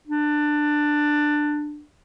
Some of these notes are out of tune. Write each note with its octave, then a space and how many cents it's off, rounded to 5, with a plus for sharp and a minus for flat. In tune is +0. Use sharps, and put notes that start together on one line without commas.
D4 +15